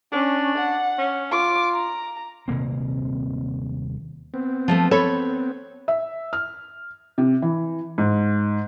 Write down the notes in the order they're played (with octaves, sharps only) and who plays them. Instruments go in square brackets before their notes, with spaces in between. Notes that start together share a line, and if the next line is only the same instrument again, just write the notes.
[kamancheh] C#4 [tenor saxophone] D4
[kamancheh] F#5
[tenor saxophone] C#4
[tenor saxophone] F4 [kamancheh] D6
[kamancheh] A#5
[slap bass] D#1 C3 A#3 C4
[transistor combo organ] B3 C4
[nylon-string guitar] F3 G#3 A3
[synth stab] A4 B5 [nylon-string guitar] C#5
[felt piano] E5
F6
C3
E3
G#2